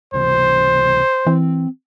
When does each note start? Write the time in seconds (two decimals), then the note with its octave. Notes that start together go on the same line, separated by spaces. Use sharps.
0.14 C#2 C3 E3 C5
1.27 E3 C4